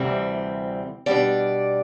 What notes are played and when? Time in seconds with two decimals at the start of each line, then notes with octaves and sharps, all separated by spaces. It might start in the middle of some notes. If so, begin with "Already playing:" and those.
Already playing: D2 C3 E3 G3 C4
1.06 B2 G3 D4 D5